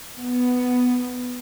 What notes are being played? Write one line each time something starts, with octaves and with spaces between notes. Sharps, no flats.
B3